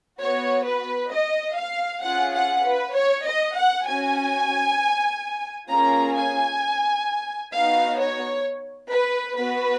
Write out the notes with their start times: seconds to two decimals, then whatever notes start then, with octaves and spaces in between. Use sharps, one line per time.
0.21 B3 F#4 C#5
0.66 B4
1.13 D#5
1.58 F5
2.04 C#4 F4 G#4 F#5
2.35 F#5
2.65 B4
2.96 C#5
3.27 D#5
3.57 F#5
3.87 C#4 F#4 G#5
5.71 A#3 C#4 F4 G#4 A#5
6.17 G#5
7.54 B3 D#4 F#4 F5
8.00 C#5
8.91 B4
9.37 B3 F#4 B4